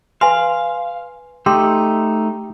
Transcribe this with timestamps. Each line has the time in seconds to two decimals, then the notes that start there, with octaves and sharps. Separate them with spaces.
0.21 B4 F5 G#5 C6
1.46 A3 D#4 G4 C6 E6